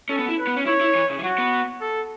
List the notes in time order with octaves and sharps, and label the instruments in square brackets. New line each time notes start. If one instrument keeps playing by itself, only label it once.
[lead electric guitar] C#4 [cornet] A4
[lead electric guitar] B3
E4
[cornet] B4
[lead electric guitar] B3
C#4
[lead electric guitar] E4 [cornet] C#5
[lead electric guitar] E4
E3
C#3
E3
[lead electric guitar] F#3 [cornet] F#4
[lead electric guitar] B3
[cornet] A4